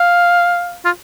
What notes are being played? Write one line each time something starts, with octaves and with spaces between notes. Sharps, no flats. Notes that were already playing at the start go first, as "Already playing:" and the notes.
Already playing: F5
F4